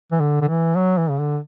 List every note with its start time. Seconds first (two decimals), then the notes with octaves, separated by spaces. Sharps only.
0.12 E3
0.20 D3
0.41 D3
0.48 E3
0.76 F#3
0.98 E3
1.09 C#3
1.19 D3